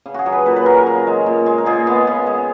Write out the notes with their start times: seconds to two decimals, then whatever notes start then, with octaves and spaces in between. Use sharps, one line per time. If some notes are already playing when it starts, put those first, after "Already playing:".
0.06 C#3
0.14 F#4 G#4
0.26 F#3
0.32 B4
0.46 A#2 B4
0.56 B4
0.66 F#3 A#4
0.77 A#4
0.87 C#3
1.07 G#3
1.26 A#2
1.46 G#3
1.58 A#4
1.66 A#2 G#4
1.87 G#3 B3
2.07 C#3
2.27 G#3